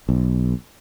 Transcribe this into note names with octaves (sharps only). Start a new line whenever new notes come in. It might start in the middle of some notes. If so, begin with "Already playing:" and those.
B1